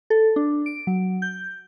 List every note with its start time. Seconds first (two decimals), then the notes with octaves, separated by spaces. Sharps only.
0.10 A4
0.36 D4
0.66 D7
0.87 F#3
1.22 G6